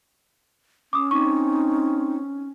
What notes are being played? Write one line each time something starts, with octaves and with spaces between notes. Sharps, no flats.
C#4 D6 D#6
C4 D#4 C#6 D6